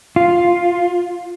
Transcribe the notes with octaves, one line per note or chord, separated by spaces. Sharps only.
F4